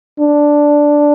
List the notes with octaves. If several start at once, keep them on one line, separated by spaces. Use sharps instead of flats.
D4